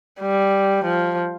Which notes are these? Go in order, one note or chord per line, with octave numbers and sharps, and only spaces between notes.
G3
F3